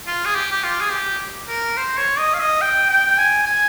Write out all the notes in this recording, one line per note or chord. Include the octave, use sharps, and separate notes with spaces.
F4
G#4
G4
G4
F4
G#4
G4
A#4
C5
C#5
D#5
F5
D#5
G5
G5
G#5
G#5